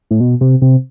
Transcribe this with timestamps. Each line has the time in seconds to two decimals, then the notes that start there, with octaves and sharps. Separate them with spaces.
0.10 A2
0.20 B2
0.41 C3
0.62 C3